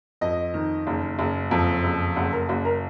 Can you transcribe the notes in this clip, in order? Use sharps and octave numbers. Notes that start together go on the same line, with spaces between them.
F2 D#5
D#3
F#1
F#1
F2
F#1
F#1 F#5
A#4
F#1 F#4
A#4